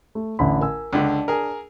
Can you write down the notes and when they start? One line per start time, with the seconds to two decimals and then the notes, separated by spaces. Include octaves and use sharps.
0.15 A3
0.39 A1 D3 B5
0.61 A#4 G#5 E6
0.93 C#2 D3 D4
1.28 G#4 A#4